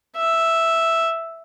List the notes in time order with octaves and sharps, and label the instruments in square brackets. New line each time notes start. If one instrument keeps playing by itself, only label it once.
[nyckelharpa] E5